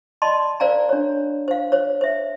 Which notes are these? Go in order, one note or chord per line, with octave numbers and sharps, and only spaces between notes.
D5 D#5 A5 B5 C6
A#4 C5 D5 F5 G#5 A#5
D4 C#5
C5 F5
C5 C#5
C5 E5